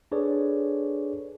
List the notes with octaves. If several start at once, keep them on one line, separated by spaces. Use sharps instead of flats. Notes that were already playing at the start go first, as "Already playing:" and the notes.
D4 G#4 A4 B4 C#5 D5